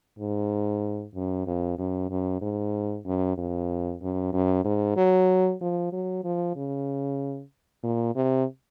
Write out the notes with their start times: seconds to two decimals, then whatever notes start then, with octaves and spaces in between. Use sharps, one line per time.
0.19 G#2
1.15 F#2
1.47 F2
1.78 F#2
2.10 F#2
2.41 G#2
3.06 F#2
3.37 F2
4.01 F#2
4.33 F#2
4.65 G#2
4.96 F#3
5.61 F3
5.92 F#3
6.24 F3
6.56 C#3
7.83 A#2
8.15 C3